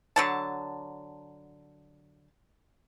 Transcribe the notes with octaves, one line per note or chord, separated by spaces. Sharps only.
D3 F#3 A5